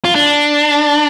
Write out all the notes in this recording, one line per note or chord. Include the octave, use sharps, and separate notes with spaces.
F4
D4